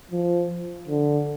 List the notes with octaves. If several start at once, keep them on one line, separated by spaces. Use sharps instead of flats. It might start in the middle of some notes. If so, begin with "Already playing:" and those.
F3
D3